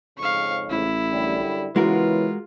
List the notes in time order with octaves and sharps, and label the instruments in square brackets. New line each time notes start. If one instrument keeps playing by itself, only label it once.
[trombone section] F2 G#2 C#3 [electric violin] F5 C#6
[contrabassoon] A1 [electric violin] E4
[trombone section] F#2 D3 G3
[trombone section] C#3 B3 [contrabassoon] E3 [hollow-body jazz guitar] G#3 F#4 A#4 [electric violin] F4